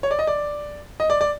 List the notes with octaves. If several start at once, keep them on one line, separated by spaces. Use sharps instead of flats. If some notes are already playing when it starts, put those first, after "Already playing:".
C#5
D5
D#5
D5
D#5
D5
D5